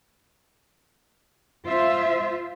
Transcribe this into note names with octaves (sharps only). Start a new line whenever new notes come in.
F4 C5 E5